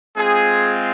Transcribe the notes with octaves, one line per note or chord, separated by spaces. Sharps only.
G#3 C4 F4 G#4